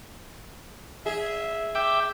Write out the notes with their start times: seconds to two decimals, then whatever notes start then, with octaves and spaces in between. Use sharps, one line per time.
1.06 G#4 E5
1.75 E5 G5 D6